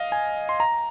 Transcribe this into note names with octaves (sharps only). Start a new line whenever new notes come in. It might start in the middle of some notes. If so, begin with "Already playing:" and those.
Already playing: D#5 F5
G#5
C6
A#5